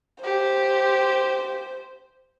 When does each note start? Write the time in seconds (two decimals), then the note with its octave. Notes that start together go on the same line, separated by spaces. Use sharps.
0.23 G4 C5